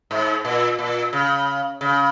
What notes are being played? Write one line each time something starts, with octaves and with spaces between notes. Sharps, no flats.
G#2
A#2
A#2
C#3
C#3